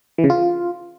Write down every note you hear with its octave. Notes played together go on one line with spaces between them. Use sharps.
E3
C#3
F4